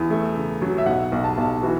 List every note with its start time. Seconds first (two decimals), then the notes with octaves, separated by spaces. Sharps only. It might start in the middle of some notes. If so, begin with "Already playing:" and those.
Already playing: E2
0.10 A3
0.37 C#3
0.62 F#3
0.78 E5
0.86 B1 F#5
1.12 B1
1.24 A5
1.38 B1 A5
1.63 E3 F#4